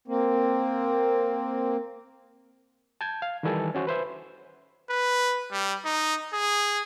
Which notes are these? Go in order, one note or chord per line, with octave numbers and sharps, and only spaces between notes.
A#3 C4
A5 G6 G#6
F5
D#3 E3 G3 A4 G#5
C#4 F#4 C5
B4 C5 E5
B4
G3
D#4
G#4